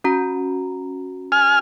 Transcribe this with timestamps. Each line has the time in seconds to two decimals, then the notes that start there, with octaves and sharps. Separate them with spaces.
0.04 C#4 F#4 A#5
1.32 G#5 F6